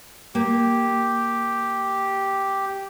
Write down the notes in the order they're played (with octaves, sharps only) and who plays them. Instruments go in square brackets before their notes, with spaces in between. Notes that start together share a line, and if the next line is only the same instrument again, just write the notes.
[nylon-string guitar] A#3 [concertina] G4